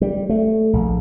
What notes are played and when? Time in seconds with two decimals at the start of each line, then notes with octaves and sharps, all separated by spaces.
0.01 G3
0.29 A3
0.73 A#1